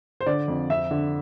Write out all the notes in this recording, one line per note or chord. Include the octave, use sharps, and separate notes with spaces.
C5
D3 D5
F2
F2 E5
D3